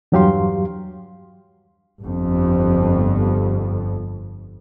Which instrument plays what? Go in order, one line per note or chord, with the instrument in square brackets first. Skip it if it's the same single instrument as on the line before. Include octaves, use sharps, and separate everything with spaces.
[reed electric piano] E2 G2 F#3 G4 F5 C6
[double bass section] G1 F2